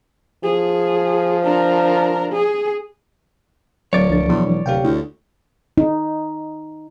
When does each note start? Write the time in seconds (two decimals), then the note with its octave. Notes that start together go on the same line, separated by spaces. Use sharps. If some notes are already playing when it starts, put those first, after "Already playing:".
0.44 F3 G#4
1.44 D4 A#4
2.32 G#4
3.93 D1 F#3 C#5 D5
4.10 C#2 F3 D4 A6
4.28 E2 B2 E3 F#3
4.46 E1
4.66 D1 C3 G4 F5 G5
4.84 D2 E4
5.78 D#4